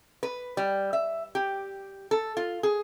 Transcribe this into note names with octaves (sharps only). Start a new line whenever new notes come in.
B4
G3
E5
G4
A4
F4
G#4